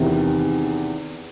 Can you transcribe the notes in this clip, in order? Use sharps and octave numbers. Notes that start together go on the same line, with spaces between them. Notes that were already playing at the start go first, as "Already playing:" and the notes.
Already playing: E2 C3 D#3